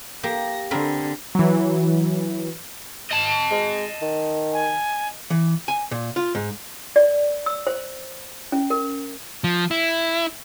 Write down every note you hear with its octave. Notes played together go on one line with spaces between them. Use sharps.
A#3 G4 A#6
D3 C4 A#4 B5
E3 F#3
D#5 A5
G#3
D#3
G#5
E3
G#5
A#2
F4
G#2
D5
E6
C5
C#4
A#4
F3
E4